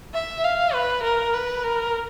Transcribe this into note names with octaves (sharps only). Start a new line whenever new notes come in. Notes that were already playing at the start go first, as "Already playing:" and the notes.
E5
F5
B4
A#4
B4
A#4